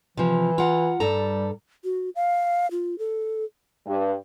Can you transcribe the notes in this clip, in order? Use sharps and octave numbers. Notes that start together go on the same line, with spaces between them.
C3 E3 F3
F4 F#5 A#5
G2 G3 A4 A#5
F#4
F5
F4
A4
G2